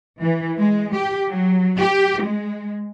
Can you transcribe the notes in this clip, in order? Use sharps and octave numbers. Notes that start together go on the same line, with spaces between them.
E3
G#3
G4
F#3
G4
G#3